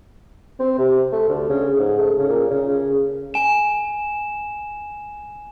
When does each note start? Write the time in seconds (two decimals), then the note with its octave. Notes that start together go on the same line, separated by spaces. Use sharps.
0.59 C4
0.78 C3
1.12 A3
1.28 D2
1.49 C#3
1.78 G#2
1.98 A3
2.18 C#3
2.30 A#2
2.50 C#3
2.69 C#3
3.34 G#5 E7